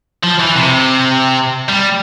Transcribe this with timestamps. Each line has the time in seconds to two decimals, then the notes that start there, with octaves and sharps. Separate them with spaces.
0.24 F3
0.40 E3
0.56 C3
1.69 G3